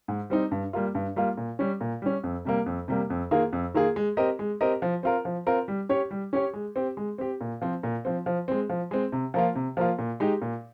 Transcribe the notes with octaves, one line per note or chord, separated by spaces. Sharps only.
G#2
G3 C4 D#4
G2
G3 A#3 F4
G2
G3 A#3 F4
A#2
G3 C#4
A#2
G3 C#4
F2
C3 G3 A#3
F2
C3 G3 A#3
F2
D#3 A#3 F4 G#4
F2
D#3 A#3 F4 G#4
G#3
C4 G4 A#4 D#5
G#3
C4 G4 A#4 D#5
F3
C4 F4 A#4
F3
C4 F4 A#4
G3
C#4 G4 C#5
G3
C#4 G4 C#5
G#3
C4 G4
G#3
C4 G4
A#2
F3 C4
A#2
F3 C4
F3
G#3 C4
F3
G#3 C4
C3
F3 A#3 F4
C3
F3 A#3 F4
A#2
G#3 D#4 G4
A#2